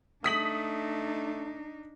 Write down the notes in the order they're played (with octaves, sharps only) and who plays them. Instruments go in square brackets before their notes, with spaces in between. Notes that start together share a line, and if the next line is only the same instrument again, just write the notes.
[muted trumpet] A3 [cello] D4 D#4 [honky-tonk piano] D#6 B6 F#7